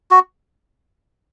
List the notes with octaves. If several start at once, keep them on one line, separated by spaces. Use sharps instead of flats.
F#4